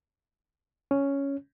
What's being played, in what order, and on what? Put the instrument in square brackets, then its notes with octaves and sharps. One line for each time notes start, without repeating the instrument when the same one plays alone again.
[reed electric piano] C#4